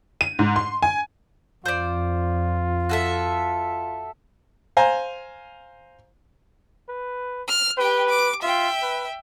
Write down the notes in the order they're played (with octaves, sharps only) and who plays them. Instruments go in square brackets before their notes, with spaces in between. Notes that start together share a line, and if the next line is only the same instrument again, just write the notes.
[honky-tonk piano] D#7
G#2
C6
G#5
[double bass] F2 [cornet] F4 [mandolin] C5 D5
[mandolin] F#4 A4 E5
[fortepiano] C5 F5 G#5 A#5
[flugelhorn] B4
[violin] F6
[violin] G4 G5 [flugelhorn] B4
[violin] D6
[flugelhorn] F4 [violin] E5 G5
[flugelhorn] B4